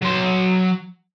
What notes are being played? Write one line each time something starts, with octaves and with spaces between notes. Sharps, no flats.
F#3 C6